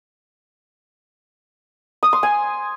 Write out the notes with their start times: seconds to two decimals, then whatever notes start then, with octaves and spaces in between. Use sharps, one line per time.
2.03 D#6
2.13 C6
2.23 G#5